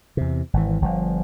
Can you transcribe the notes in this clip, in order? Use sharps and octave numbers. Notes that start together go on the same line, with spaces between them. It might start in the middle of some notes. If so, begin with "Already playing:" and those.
E2 C3
G#1 E3
G1 F3